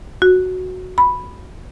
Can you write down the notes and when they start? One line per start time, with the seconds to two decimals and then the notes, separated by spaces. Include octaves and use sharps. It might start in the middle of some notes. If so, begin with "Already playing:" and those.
0.22 F#4
0.98 B5